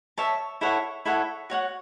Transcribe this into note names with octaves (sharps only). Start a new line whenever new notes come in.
C#5 E5 A5
E4 A4 C#5 F#5
E4 A4 C#5 F#5
F#4 C#5 F#5